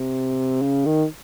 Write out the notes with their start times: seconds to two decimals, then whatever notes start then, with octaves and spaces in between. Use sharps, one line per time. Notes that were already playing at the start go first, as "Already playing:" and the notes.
Already playing: C3
0.62 C#3
0.86 D#3